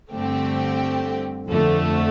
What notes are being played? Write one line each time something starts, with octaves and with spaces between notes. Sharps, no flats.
G2 D3 A3 C4 G4
F2 D3 A3